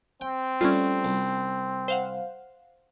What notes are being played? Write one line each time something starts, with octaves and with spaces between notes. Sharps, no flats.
C4 G5
G3 A3 C#4 D4 F4
C2
C5 F5 F#5